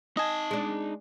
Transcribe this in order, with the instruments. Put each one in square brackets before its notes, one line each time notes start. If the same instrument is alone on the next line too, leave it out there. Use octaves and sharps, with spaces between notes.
[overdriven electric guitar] D#4 A5 [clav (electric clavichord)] D#5 G#5
[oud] G#3 D4